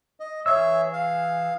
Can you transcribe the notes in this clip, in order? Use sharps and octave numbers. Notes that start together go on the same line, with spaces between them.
D#5
E3 G#4 C#5 E5 E6
F5